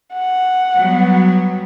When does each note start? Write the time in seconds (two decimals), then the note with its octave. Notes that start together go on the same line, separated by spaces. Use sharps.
0.14 F#5
0.77 F#3 G3 B3